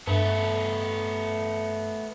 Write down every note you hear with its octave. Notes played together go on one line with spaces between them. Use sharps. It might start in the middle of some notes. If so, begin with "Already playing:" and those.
G2 A3 B3